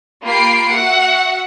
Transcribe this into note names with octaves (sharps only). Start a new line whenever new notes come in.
A#3 F4 G4 B5 C7 D7
F#4 E5 F#5